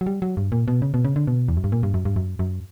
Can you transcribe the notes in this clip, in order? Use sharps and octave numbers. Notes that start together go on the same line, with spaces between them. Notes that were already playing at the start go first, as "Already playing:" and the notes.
F#3
G3
F#3
G2
A#2
B2
C#3
B2
C#3
D3
B2
E2
F#2
G2
A#2
G2
F#2
G2
F#2
F#2